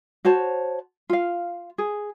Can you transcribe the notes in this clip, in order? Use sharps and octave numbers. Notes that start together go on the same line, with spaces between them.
F#4 C5 C#5 A5
F4 F5
G#4